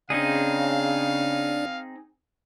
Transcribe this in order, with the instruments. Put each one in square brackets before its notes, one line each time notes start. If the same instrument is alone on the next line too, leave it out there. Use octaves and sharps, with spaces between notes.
[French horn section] C#3 [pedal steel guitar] C4 D#4 G#4 [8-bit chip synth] D4 D5 [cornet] F5